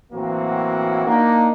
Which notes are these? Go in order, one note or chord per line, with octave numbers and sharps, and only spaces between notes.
A2 E3 F#3 A#3 C4 F#4
A#3 D4 D#4